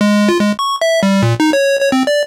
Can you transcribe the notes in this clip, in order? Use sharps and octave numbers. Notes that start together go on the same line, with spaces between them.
G#3
F4
G#3
C#6
E5
G3
A#2
D#4
C#5
C#5
C4
D5